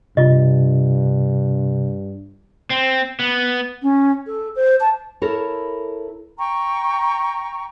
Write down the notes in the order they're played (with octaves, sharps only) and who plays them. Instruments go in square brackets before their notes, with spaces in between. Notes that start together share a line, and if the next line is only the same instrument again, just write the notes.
[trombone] G2 [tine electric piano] C3 [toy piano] F4 D#5
[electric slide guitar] C4
B3
[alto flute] C#4
A4
C5
A5
[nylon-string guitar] E4 A4 A#4 C#5
[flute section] G5 A#5 C#6